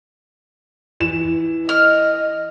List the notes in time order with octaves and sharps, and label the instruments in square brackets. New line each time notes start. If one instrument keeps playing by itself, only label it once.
[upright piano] E3 E7
[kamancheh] D#5 [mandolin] F6